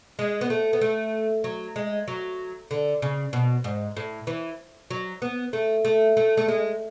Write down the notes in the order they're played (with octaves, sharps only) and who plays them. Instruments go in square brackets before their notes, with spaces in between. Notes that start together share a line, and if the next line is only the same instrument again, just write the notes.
[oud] G#3
B3
A3
B3
A3
F#3
G#3
F#3
D3
C#3
B2
G#2
A2
E3
F#3
B3
A3
A3
A3
A3
G#3